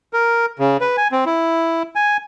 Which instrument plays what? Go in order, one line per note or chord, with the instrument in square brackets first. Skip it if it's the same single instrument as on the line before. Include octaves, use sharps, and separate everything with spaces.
[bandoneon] A#4
C#3
B4
G#5
C4
E4
G#5